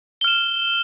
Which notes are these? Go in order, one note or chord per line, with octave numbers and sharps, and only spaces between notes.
F6 E7 G7